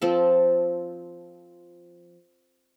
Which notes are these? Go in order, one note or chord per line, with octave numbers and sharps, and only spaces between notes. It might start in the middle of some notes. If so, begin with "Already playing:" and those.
F3 C4 A4